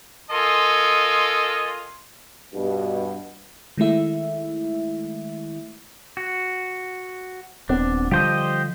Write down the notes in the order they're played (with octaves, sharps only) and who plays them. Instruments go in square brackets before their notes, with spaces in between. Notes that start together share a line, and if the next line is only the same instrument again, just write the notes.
[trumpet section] F4 A4 A#4 D#5 G#5 C6
[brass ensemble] G2 B2
[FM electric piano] D#3 G#3 A3 E4 E5
[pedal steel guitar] F#4
[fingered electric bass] D#1 B3 C4 [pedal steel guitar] D4
[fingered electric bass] D3 F3 G3 [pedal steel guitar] G4 C5 D#5